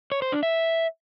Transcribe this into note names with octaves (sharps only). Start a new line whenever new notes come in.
C#5
C5
D4
E5